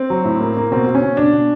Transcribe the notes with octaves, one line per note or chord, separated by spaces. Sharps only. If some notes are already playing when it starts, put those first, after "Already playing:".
Already playing: C4
F#3
A2
A#3
A#3
B2 C4
B2
C#4
B2
B2 D4
B2